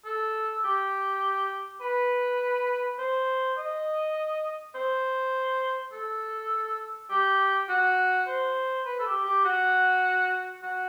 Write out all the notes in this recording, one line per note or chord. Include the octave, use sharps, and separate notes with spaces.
A4
G4
B4
C5
D#5
C5
A4
G4
F#4
C5
B4
A4
G4
G4
F#4
F#4